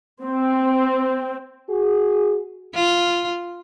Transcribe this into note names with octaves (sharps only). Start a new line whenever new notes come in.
C4
F#4 G#4
F4